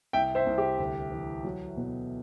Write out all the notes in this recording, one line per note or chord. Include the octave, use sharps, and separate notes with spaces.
C2 E5 G5
C5 E5
C2
G4
D2
E3
F#3
B2